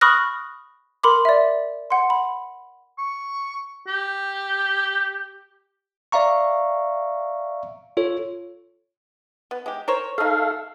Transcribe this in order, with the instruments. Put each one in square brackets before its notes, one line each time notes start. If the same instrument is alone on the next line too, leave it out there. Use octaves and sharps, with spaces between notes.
[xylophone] B5 C#6 D#6 F6 F#6 A#6
A#4 B5 C6 D6
D5 E5
F#5 C6
B5
[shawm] C#6
G4
[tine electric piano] D5 E5 F5 A#5 C#6
F4 A4 C#5
[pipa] B3
G#3 G4
A#4 C5 C#5
[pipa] A3 D#4 [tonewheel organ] A4 F5